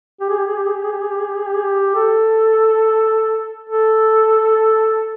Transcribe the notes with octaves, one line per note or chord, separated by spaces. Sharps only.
G4
G#4
G4
G#4
G4
G#4
G4
G#4
G4
G#4
G4
G#4
G4
G#4
G4
G#4
G4
A4
A4